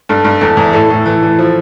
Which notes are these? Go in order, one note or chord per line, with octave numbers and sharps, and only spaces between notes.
G2 A4
G2
E2 A4
E2
A2 A4
A2
E3
E3
F3